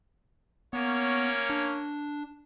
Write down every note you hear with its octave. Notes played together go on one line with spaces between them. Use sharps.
A#3 B3 C#4 C#5
D4